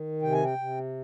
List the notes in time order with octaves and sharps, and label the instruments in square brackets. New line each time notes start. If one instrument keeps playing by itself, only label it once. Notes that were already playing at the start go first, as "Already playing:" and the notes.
Already playing: [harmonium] D#3
C3 G5
G#5
G5
C3